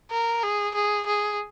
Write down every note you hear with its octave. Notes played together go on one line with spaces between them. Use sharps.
A#4
G#4
G#4
G#4